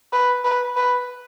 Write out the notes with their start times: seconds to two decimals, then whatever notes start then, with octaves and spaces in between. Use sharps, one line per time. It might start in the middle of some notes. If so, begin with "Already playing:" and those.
0.13 B4
0.44 B4
0.76 B4